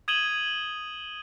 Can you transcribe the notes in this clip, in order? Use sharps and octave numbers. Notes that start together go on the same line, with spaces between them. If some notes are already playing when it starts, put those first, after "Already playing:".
D#6 G#6 D#7 E7 F#7 G7